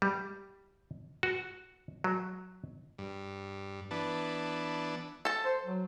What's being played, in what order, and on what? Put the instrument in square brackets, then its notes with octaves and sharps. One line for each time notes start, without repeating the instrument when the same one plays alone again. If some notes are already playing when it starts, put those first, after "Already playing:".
[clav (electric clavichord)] G3
F#4
F#3
[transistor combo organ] G2
E3 B3 D4 A5
[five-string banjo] A4 A5
[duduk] C5
F#3